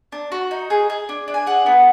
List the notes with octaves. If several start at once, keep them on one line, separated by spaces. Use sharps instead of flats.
D4
F#4
D#4
G#4
G#4
D4
D4
G#5
G#4 F#5
B3